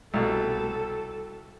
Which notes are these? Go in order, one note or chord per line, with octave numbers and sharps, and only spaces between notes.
C2 B2 A4